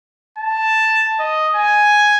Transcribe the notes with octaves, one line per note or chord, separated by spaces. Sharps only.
A5
D#5
G#5